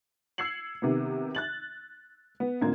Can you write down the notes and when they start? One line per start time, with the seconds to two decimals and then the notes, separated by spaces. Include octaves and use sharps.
0.38 E6 G#6 C7 C#7 F#7
0.82 C3 D#3 B3
1.35 F#6 A6 F#7
2.40 B3
2.61 A1 D3 A#3 C4 F4 G#6